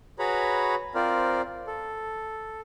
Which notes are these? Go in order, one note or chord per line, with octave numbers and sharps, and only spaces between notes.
F#4 G#4 B4 C#5 A#5 B5
C4 F4 A#4 C5 D5
A4